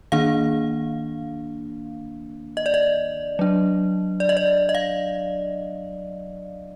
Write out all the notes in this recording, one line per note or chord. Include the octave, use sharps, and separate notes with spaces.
D#3 A#3 D4 F5
D#5
D5
D#5
F#3 D4
D5
D#5
D5
D#5
F5